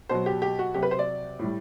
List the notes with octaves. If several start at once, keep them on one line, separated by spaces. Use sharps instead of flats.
B2 F#3 C5
G4
G4
F#4
C3 F#3 G4
B4
C5
D5
A2 G3